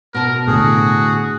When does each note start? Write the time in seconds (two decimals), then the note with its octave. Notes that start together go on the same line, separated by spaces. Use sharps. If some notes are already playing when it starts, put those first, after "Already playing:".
0.14 B2 A#4 A5
0.47 A2 D3 F#4 G#4